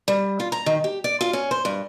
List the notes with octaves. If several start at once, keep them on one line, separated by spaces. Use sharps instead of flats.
G3
F4
A#5
D#3
G4
D5
F4
C#4
C5
G2